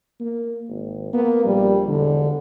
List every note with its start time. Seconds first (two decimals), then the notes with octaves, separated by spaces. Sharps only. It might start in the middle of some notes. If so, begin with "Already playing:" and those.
0.20 A#3
0.69 G#1
1.13 A#3 B3
1.45 A#1 G3
1.87 E1 D3